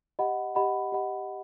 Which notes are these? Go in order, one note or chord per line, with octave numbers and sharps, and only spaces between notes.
G4 D#5 F#5 B5
G4 D#5 F#5 B5
G4 D#5 F#5 B5